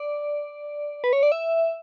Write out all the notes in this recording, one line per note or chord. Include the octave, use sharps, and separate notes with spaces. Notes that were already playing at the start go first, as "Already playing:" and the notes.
Already playing: D5
B4
C#5
D5
E5